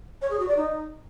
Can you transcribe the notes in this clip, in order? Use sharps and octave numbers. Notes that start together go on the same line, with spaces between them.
C#5
G#4
F#4
D5
D#4